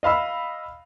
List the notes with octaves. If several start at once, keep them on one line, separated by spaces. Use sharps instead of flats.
D#5 F5 B5 E6